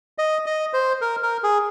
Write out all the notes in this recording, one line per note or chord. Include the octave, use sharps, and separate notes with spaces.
D#5
D#5
C5
A#4
A#4
G#4